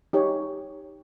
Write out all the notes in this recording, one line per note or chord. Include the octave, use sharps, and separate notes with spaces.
D#4 G4 C#5